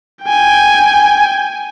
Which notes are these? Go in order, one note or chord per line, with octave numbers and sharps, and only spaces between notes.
G5 G#5